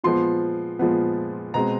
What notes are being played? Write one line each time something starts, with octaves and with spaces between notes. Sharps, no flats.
A#2 F3 G#3 B3 C6
A#2 F3 G#3 B3
B2 G#3 C4 A#5